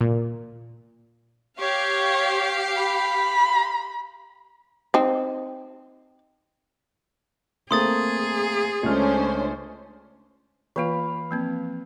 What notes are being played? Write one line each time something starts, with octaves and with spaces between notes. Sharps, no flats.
A#2
G4 C#5 F5
B5
C4 D#4
A3 A#3 C4 G#4 C6 D#6 A6
C#2 A3 C#4 D4 C5 F6
E3 A#3 F4 B4 F5
F3 A#3 C4